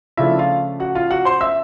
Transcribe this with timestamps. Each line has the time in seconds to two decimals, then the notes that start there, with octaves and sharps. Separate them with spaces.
0.17 C#3 F3 A3 D4 E4 F4 E5
0.39 F4 F5
0.80 F#4 F#5
0.95 F4 F5
1.11 F#4 F#5
1.25 C5 C6
1.41 E5 E6